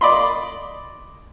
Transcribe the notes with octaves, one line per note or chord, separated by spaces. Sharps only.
D5 D#5 B5 C6